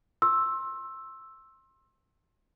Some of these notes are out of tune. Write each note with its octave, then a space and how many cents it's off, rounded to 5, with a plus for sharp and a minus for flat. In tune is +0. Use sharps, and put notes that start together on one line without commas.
C6 +25 E6 +0